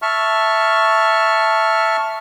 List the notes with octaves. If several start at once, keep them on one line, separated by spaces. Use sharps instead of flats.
E5 A5 C#6 F6